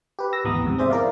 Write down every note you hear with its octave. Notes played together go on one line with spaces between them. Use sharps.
G4 B4
E6 A#6
G#1 D2 E3 B3 A#5 D#6
F2 G#2 C3
C4 G#4 C5 D5 E5
E4 A#4 D5 F5